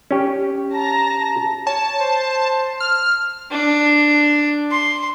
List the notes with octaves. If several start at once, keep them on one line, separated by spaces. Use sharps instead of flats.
C#4 G4
A5 A#5 A#6
C#5 A5
C5
F6
D4
C6